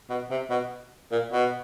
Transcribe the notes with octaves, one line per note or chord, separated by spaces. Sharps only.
B2
C3
B2
A#2
B2